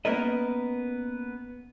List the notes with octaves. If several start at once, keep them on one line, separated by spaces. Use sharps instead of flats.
A#3 B3 C#4 A#4 B4 D#5